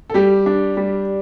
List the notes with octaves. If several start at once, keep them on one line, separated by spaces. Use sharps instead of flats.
A4
G3 G4
D4
G3